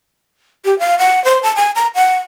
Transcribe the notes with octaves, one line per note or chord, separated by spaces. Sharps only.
G4
F5
F#5
C5
A5
G#5
A#5
F#5